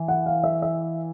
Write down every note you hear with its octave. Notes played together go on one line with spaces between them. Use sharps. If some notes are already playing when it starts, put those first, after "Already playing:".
Already playing: E3
F#5
F5
E5
E5